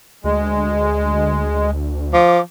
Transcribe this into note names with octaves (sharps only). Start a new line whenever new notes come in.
D2 G#3
F3 D6